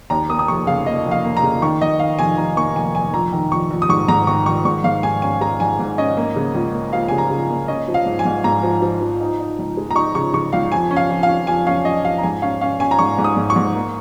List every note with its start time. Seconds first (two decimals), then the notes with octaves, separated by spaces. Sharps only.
0.10 D#2 A#5
0.29 A#3 D#6
0.39 D#6
0.48 F1 C#6
0.67 C#3 F5
0.86 A#3 D#5
1.05 F1
1.11 F5
1.24 A#3
1.37 A#5
1.43 C#3
1.62 D#3 C#6
1.81 D#3 D#5
1.99 D#3 F5
2.19 F1 G#5
2.38 F1 A#5
2.57 A#3 C#6
2.76 F1 G#5
2.94 F1 G#5
3.13 A#1 A#5
3.33 D#3
3.51 A#1 C#6
3.70 A#1
3.82 D#6
3.89 G#2 C#6
4.08 G#2 A#5
4.27 D#3 C#6
4.46 D#3 C#6
4.65 G#2 C#6
4.84 G#2 F5
5.03 G#2 G#5
5.22 C#4 G#5
5.41 G#3 A#5
5.60 G#2 G#5
5.79 G#2
5.98 C#4 D#5
6.17 A#3
6.36 C#3
6.55 C#2
6.74 A#3
6.93 F3 F5
7.08 C#3 G#5
7.18 A#5
7.30 C#3
7.49 A#3
7.68 C#4 D#5
7.88 F3
7.94 F5
8.06 G#2
8.19 G#5
8.25 G#2
8.44 G#2 A#5
8.63 F3
8.82 F3
9.01 F3
9.20 D#4
9.39 D#4
9.59 C#2
9.77 G#3
9.91 A#5
9.95 D#4 C#6
10.15 C#3 C#6
10.33 C#3 C#6
10.53 C#2 F5
10.72 F2 G#5
10.91 C#4
10.96 F5
11.10 F2
11.23 F5
11.29 C#4
11.47 F2 G#5
11.67 C#4 F5
11.85 C#4 D#5
12.05 F3 F5
12.18 A#5
12.23 G#2 G#5
12.42 C#4 F5
12.61 C#4 F5
12.80 C#4 G#5
12.91 A#5
12.99 G#2 C#6
13.18 G#2
13.24 D#6
13.37 G#2
13.50 C#6
13.56 G#2
13.75 A#3